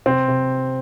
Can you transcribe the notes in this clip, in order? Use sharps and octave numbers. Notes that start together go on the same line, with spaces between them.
C3 C4
C3